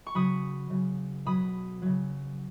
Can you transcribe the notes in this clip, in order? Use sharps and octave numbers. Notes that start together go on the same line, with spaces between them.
C#6
C#3 F#3 B5 D#6
C#3 F#3
B2 F#3 B5 D#6
C#3 F#3